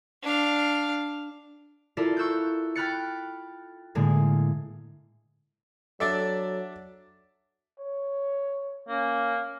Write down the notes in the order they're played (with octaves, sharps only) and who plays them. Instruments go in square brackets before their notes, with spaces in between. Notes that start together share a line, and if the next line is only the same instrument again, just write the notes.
[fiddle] D4 F5
[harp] E4 F4 A4 A#4 D5
C#6 E6 F#6 G6
G5 B5 F6 F#6 A6 C#7
A2 D3 G#3 A#3
[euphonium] F#3 [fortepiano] D4 D5 E5 [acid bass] A4
[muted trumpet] C#5
[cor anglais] A#3 [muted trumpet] C#4